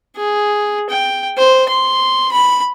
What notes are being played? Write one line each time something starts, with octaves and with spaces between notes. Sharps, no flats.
G#4
G5
C5
C6
B5